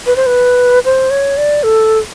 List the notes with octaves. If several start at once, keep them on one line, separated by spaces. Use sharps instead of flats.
B4
C5
B4
C5
C#5
D5
A4